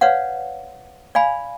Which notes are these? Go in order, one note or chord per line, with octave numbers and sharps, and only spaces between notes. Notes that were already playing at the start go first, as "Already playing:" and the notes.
B4 C#5 D5 F5 F#5
D5 F5 G#5 B5